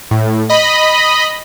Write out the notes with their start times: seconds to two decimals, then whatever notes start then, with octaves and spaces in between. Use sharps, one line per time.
0.11 A2
0.49 D#5 B5